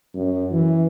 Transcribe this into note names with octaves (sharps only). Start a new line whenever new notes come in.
F#2
E3